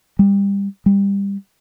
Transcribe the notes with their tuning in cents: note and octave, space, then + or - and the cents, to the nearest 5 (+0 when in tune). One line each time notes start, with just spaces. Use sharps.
G3 +25
G3 +20